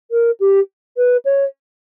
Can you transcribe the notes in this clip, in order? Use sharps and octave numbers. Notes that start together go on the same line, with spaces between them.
A#4
G4
B4
C#5